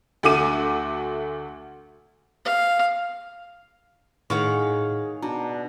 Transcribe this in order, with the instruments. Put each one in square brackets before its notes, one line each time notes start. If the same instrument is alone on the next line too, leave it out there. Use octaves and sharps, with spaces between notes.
[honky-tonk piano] D2 A3 F#4 D6 D#7
[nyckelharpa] F5
[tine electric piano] A2 [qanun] D#3 [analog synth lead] G#4 [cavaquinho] C#5 F5 F#5
[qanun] B2 [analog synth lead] D4 [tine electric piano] A#5